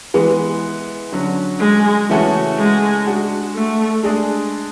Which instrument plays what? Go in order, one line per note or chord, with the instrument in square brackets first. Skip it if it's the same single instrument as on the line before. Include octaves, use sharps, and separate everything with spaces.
[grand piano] E3 G#3 B3
D3 F#3 C#4
[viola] G#3
[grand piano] C#3 E3 A3 C#4 F#4
[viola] G#3
[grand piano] G#3 D4 F#4
[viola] A3
[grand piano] G#3 D4 G#4